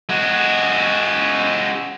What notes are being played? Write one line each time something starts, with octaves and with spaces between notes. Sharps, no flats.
G#3 F#4